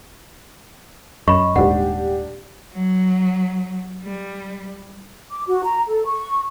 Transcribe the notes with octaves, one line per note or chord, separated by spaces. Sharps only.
F#2 D#5 B5 C#6
D#1 G#2 D4 G4 F#5
F#3
G3
D6
F#4
A#5
A4
C#6